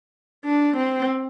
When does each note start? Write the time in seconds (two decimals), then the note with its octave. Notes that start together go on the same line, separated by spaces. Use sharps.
0.45 D4
0.77 C4